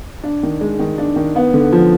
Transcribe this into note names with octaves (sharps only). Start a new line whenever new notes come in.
D4
D#3
G#3
D#3
D4
D#3
B3
D3
F3